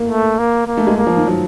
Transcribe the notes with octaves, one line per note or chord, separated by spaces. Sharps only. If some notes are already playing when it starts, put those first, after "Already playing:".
Already playing: A#3
A3
A#3
A#3
A3
G#3
A#3
F3
D#3
F#3